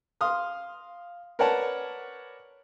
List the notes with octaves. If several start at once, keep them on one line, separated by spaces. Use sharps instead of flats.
F5 C6 D#6 F6
A#4 B4 C#5 D5 F#5 A5